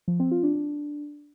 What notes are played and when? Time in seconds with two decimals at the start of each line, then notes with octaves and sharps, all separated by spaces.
0.08 F3
0.19 C4
0.31 F4
0.43 D4
0.55 D4